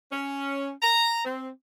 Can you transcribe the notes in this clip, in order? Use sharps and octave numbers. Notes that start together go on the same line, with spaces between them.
C#4
A#5
C4